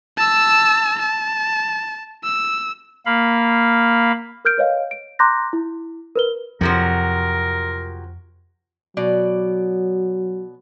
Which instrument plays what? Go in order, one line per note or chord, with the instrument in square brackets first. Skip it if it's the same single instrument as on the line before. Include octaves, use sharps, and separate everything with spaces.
[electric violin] A5 E6
A5
E6
[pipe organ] A#3 F5 B5
[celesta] A#4 F6 G6 D7
B4 C#5 D#5 F5
D7
A#5 C6 D6 F#6 G6 A#6
E4
A#4 B4 G7
[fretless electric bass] F2 [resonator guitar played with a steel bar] C3 F3 F#3 [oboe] A#4
[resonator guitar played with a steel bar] B2 D5 [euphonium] F#3